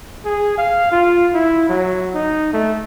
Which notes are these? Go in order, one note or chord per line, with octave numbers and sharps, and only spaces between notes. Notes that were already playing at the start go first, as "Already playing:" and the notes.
G#4
F5
F4
E4
F#3
D#4
A3